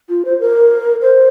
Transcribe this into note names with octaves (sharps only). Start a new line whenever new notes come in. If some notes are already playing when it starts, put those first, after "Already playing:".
F4
C5
A#4
C5